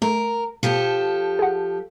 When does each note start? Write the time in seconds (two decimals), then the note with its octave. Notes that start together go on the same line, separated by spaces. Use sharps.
0.02 A3 A#4
0.63 B2 F3 G4 A4
1.39 G#4 F#5